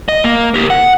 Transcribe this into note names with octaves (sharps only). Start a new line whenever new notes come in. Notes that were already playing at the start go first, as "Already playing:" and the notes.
D#5
A#3
G4 A#4
F#5